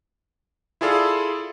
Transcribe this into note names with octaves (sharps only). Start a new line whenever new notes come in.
E4 F4 G#4 A4 D5 F5